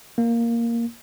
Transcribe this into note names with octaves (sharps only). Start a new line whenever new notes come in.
A#3